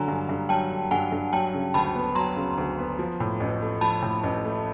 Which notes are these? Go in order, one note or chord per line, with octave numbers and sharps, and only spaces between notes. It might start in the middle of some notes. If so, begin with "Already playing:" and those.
Already playing: D3 F#3 G#5 A#5
G2
G2
F#3 G5 A5
D3
G2 F#5 G#5
G2
F#3 G5 A5
C#3
D2 A5 B5
B3
F#3 A#5 C6
C#3
D2
B3
F3
A2
A1
A3
F3 A5 B5
A2
A1
A3